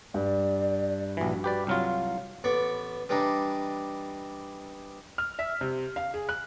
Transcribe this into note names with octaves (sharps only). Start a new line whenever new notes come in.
G2 D5
A#1 E3 F#4
G4 B4 D5
C2 F#3 F4 F6
F5
A1 B3 D5 C#6
E3 G3 D4 D#4
F6
E5
C3
F5
G#4
F#6